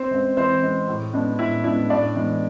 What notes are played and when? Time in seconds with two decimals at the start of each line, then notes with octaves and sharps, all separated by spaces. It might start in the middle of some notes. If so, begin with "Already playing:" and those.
Already playing: C4 C5
0.11 G#3 C4
0.37 E3 C4 C5
0.63 G#3 C4
0.88 A2
1.14 G#3 B3 D4
1.39 A2 E4 E5
1.64 G#3 B3 D4 E4 E5
1.90 A2 D4 D5
2.15 E3 G#3 B3